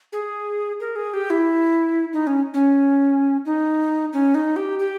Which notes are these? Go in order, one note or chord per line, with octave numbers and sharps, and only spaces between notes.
G#4
A#4
G#4
G4
E4
D#4
C#4
C#4
D#4
C#4
D#4
G4
G4